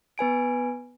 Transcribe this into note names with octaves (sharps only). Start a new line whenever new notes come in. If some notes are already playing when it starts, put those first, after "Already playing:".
B3 B4 G#5 D7